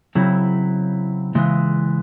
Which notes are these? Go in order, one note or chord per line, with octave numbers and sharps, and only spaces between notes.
C#3 F#3 C4 E4
C#3 E3 G#3